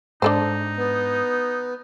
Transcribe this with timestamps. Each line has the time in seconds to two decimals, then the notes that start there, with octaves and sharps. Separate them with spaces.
0.22 G#2 D4 D#4 A4 C5
0.77 B3